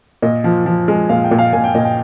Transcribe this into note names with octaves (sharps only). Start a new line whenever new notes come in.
A#2 D#5
F3
F3
G#3
A#2 F5
G5
A#2
F5
A#2 G#5
G5
A#2 D#5
G5